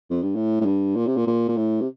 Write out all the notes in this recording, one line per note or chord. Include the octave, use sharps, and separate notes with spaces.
F2
G2
A2
A2
G2
A#2
C3
A#2
A#2
A#2
A2
C3